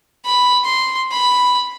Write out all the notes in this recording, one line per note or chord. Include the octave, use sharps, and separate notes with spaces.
B5
C6
B5